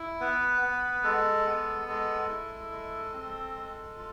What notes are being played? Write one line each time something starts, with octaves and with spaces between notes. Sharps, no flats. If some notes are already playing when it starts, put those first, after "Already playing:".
Already playing: E4
B3 B4
B3
G#3 A4
B3
G#3 A4
E4
G#3
C4
G#3
F4